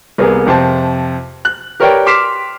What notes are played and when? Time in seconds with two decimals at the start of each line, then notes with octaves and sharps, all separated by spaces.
0.18 C2 A#3 B3 G#4
0.46 F2 C3 C5 A5
1.45 F#6
1.80 G4 A#4 B4 C#5 D5 G5
2.06 C6 D6 F6 B6 C7 E7